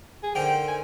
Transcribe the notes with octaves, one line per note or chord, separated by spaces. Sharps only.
G#4
D3 D#3 C5 G5
G#5